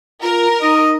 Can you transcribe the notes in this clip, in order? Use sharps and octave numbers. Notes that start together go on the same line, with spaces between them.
F4 A#4
D#4 D#5